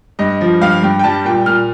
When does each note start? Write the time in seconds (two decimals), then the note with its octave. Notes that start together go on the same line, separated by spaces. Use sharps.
0.19 G2 D#5
0.41 F3
0.61 G2 F5
0.83 G2 G5
0.99 G5
1.04 G3 A5
1.25 A#2 G5
1.46 A#2 F6